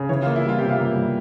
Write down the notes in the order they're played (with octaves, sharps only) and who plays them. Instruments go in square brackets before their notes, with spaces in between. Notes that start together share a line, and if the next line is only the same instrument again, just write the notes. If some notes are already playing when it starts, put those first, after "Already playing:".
Already playing: [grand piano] C#3
[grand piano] E3 [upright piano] C#5
[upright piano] F4
[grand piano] A#3
[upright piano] E4
[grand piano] G3 [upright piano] F4
[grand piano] C3 [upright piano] G4
[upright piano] F4
[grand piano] A#3
G3